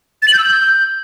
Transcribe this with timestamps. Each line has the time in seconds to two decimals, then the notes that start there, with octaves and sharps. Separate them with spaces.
0.22 A6
0.28 F#7
0.33 G6
0.39 E6
0.44 G6